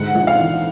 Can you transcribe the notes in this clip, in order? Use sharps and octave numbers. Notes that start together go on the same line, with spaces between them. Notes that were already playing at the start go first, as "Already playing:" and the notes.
Already playing: G#2 D3 F#5
A#1
F5
E3